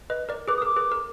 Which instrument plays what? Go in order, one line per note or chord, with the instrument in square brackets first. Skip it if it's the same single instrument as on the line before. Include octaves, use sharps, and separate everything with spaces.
[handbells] B4 D#5
A#4 D5
[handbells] G#4 B4 [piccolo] D6
[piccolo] D#6
[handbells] A#4 [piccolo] D6
[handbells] G#4 B4
A#4